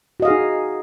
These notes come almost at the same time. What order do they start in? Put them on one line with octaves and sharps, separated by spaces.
F#4 D#5 F5 G#4 D#4